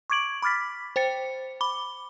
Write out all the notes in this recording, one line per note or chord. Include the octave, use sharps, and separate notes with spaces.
C#6 D6 G#6 D7 F#7
B5 D6 F6 A6 B6
C5 G5 A6 C#7
B5 D6 G7